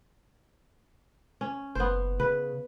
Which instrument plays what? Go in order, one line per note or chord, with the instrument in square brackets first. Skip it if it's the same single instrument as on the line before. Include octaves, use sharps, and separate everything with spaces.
[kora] C#4
[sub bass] F#1 [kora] B3 C5
[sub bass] C#3 [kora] B4